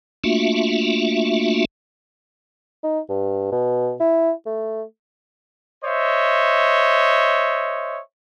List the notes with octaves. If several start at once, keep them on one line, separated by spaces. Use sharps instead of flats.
A3 A#3 D4 F4 F#4 E5
D#4
G2
B2
E4
A3
C5 C#5 D#5 E5